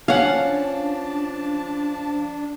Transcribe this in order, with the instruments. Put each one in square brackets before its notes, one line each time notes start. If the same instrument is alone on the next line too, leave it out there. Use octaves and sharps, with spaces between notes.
[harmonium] F3 A5 [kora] C#4 [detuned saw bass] D4 [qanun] F5 F#5